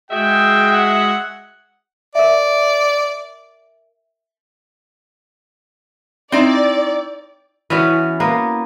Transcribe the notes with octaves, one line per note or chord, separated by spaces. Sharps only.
G#3 F#4 G#4 E5 G5
F#5
A#4 D5 E5
C4 D#4 E4 D5
E3 B3 C#4 F#4
A#3 B3